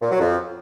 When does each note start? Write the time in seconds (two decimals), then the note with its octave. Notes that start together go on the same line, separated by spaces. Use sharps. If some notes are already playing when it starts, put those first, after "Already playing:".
0.01 A#2
0.10 F#3
0.20 F2